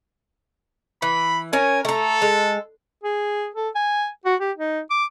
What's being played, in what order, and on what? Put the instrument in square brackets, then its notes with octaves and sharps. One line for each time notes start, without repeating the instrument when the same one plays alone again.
[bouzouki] E3 [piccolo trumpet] B5
[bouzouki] C#4 A#4 [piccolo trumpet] G#5
[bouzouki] A3 A#5 [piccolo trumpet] A4
[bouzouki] G#3
[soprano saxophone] G#4
A4
G#5
F#4
G4
D#4
D6